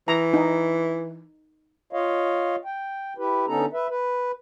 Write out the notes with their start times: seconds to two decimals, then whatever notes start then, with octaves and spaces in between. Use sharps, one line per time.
0.08 E3 A#5
0.34 D#4
1.93 F4 C#5 D#5 F5
2.65 G5
3.18 E4 G4 B4
3.48 D3 B3 C#4 D#4 A4 A#5
3.73 B4 E5
3.88 B4